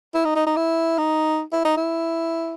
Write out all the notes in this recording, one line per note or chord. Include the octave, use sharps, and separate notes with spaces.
E4
D#4
D#4
D#4
E4
D#4
E4
D#4
E4